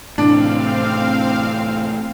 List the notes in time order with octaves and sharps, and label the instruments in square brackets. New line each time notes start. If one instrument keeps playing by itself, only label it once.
[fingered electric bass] A2 C3 E3 [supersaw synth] C4 F5 [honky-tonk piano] D4